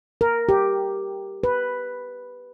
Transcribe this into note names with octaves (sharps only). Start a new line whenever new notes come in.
A#4
G4
B4